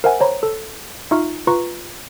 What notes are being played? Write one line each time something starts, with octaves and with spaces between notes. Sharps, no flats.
A#4 C5 E5 F#5 G#5
C5 C#5 A#5 B5
A4
D#4 F4 E5 A#5 C#6 F6
F4 B4 A#5 C#6